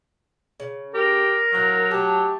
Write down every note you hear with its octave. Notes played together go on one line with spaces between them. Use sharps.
C#3
G4 A#4
A2 F#3 F5 F#5
A3 G4 A5